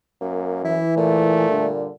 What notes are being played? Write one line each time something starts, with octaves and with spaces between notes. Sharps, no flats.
F#2 A#3
E3 E4
A#2 A3
G2 D3